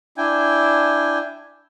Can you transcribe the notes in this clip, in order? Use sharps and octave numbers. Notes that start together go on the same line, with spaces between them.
D4 E4 G5 G#5